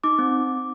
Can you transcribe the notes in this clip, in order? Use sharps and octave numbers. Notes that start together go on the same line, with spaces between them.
D#4 D6
C4